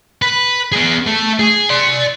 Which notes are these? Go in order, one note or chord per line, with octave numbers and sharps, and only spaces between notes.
B4
B3 G#4
A3
G#4
D5 C6